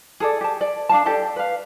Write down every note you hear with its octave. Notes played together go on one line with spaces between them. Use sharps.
G#4 A4 D5
G4 A5
D5
D4 F5 A5
G4 A4 D5 A5
B4 F5